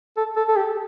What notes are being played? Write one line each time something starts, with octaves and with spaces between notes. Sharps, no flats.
A4
A4
A4
G4